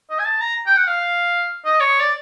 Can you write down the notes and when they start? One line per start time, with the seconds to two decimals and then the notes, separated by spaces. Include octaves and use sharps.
0.10 D#5
0.19 G#5
0.25 A5
0.41 A#5
0.66 G5
0.77 F#5
0.87 F5
1.65 D#5
1.80 C#5
2.00 D5